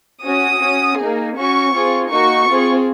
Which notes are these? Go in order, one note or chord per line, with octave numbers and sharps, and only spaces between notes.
C#4 F#4 D#6
C#4 F#4
A#3 D#4 G#4
C#4 F#4 C#6
C4 F4 G#4
A#3 D#4 F#4 C#6
C4 F4 G#4